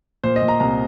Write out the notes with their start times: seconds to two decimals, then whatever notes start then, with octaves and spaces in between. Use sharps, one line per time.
0.24 A#2 C5
0.36 D#5
0.42 A#2
0.48 A#5
0.60 C2 A#5